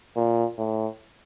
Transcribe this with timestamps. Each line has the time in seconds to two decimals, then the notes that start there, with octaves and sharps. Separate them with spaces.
0.16 A#2
0.58 A2